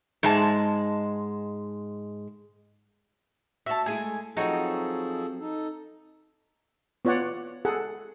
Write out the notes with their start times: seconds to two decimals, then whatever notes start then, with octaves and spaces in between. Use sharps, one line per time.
0.23 G#2 G#3 A5
3.66 F#4 C#5 E5 A5
3.86 G#3 A3 E4 G#4 G#5
4.37 F3 F#3 C4 D#4 F#4 G#4 A4 C#5
5.40 D#4 A4
7.05 B3 F4 C#5 D5 F#5
7.65 G#4 A4 F#5